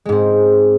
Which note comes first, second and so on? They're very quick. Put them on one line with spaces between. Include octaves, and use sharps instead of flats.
G#3 G#2 C4